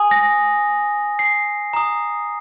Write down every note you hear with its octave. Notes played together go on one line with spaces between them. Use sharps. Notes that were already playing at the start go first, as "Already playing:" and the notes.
Already playing: G#5 D#6
A#6
C7
A#5 D#6